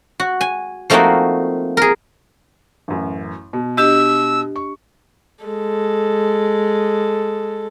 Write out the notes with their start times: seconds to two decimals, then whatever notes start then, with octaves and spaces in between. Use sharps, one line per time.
0.20 F#4
0.41 G#5
0.90 F3 A3 A#3 C4 D#4 F#4
1.77 G#4 A#4
2.88 A1 F#2
3.53 B2
3.77 D4 G4 D#5 E6
4.56 C#6
5.44 G#3 A4